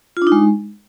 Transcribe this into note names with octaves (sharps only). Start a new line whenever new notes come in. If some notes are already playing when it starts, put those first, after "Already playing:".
F4
D4
D#4
G#3